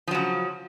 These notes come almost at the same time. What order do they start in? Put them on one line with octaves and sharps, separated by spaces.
F3 F#3 C#3